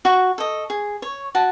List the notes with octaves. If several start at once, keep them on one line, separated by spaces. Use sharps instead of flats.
F#4 C#6
A4 D#5
G#4
C#5
F#4 A5